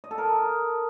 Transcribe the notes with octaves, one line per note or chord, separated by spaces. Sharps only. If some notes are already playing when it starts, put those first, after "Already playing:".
D#5
A4
A#4